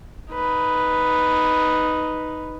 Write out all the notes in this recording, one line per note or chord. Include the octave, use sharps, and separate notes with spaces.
D#4 B4